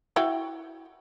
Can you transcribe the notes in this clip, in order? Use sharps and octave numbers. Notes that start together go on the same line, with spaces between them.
E4 F#4 G5